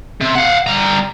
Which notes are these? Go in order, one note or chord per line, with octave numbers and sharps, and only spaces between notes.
C3
F5 F#5
G3 A#5